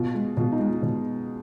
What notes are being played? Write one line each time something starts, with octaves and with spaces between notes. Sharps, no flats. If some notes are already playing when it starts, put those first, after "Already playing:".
Already playing: B2 F4
G#3
B2 F4
D#4
G#3
F4
B2